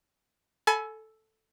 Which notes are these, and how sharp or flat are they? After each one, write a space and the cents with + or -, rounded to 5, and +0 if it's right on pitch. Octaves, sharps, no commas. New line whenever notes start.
A4 +0 G#5 +30 B5 +0